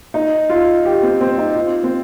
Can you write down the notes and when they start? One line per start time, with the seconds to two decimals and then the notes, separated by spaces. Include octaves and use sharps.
0.14 D#4
0.50 F4
0.85 G4
1.03 C4
1.21 C4
1.38 D#4
1.56 F4
1.84 C4